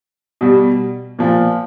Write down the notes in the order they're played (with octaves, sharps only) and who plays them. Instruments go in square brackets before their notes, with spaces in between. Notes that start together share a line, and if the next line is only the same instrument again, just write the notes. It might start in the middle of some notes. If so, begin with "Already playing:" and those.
[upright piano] B2 G3
A#2 F3